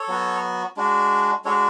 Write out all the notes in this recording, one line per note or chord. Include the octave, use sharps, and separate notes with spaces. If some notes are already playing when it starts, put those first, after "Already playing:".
Already playing: A4 C#5
F#3 B3 F#4
G#3 D4 F#4
G#3 D4 F#4 A4 C#5